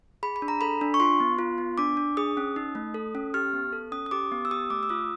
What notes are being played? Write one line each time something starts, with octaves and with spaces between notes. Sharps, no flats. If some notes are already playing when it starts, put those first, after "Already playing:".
G#4 B5
B5
D4
A#5
A4 B5
D4
C#6
F4 C6
B3
F4
B3
D4 D6
D4
G#4 D#6
C#4
D#4
A3
A4
C#4
G4 F6
B3
A4
C#4 D#6
D#6
G4 D6
B3
E6
G4 D#6
A3 D6
E6
F4 D#6